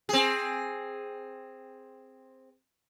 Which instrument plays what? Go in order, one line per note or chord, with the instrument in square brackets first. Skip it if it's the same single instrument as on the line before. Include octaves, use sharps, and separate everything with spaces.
[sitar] C4 G#4